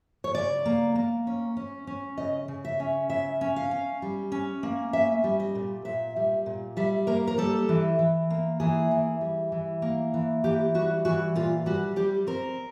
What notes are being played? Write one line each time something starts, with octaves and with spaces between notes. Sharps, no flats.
C#5
C#3 D5
A#3
A#3
C#4
C#4
C#4
C#3 D#5
C#3
E5
C#4
C#3 E5
C#4
F5
C#4
G3
C#4
A#3
C#4 E5
G3
D#5
A#2
A#2 E5
G3
A#2
G3 E5
A#3 A#4
A#4
G3 A4
E3
E3
A#3
E3 G#4
E3
G3
E3
A#3
E3
E3 G4
G3 F#4
E3 F#4
A#2 F4
G3 F#4
G3 G4
C4 A#4